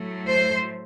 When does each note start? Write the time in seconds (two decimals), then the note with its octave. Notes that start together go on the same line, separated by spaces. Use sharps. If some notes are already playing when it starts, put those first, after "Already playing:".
Already playing: A2 F#3 A3
0.27 C5